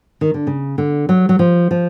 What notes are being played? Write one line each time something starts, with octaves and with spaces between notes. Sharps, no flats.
D#3
D3
C#3
D3
F#3
F#3
F3
F3